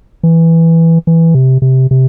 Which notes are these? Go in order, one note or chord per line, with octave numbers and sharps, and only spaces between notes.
E3
E3
C3
C3
C3